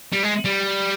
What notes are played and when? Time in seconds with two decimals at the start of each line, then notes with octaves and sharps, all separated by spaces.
0.13 G3
0.23 G#3
0.45 G3